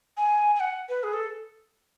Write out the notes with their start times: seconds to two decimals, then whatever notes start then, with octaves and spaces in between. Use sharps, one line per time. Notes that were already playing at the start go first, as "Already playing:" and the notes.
0.17 G#5
0.56 G#5
0.60 F#5
0.89 B4
1.03 G#4
1.13 A4